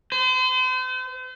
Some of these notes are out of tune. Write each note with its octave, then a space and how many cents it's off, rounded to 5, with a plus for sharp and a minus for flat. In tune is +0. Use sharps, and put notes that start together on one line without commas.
C5 -40